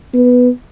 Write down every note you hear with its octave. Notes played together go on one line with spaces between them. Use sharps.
B3